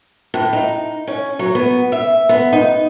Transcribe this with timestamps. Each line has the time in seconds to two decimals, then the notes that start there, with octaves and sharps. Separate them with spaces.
0.34 A2
0.53 D#4
1.07 C#4
1.39 F#3
1.55 B3
1.92 E5
2.29 B3
2.53 D#4